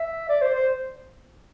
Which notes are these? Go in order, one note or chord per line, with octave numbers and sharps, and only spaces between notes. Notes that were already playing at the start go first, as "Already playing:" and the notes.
Already playing: E5
D5
C5
C5